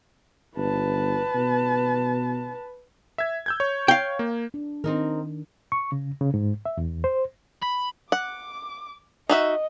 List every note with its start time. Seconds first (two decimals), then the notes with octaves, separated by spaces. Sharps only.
0.57 G1 B4 A5
1.35 B2
3.18 E5 G#6
3.46 E6 G6 G#6
3.60 C#5
3.88 F5 G5
4.19 A#3
4.54 D4
4.84 D#3 C4 D#4 A#4
5.72 C#6
5.92 C#3
6.21 C#3
6.34 G#2
6.65 E5
6.77 E2
7.04 C5
7.62 B5
8.12 F#5 D6
9.30 D#4 F#4 D#5 E5